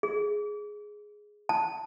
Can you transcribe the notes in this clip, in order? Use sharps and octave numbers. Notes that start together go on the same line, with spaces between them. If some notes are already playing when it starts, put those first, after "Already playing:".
G#4
A5